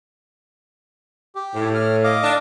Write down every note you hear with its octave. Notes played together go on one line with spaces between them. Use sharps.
G4
A2
F6
D#5 F5 D6
D4